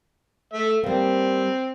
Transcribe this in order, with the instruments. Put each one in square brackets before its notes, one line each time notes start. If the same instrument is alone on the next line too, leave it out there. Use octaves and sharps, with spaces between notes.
[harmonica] A3 E5
[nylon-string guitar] G3 A#3 [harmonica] C4